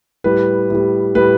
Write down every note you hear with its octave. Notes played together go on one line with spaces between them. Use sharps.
A2 G3 B4
A2 G3
A2 G3 B4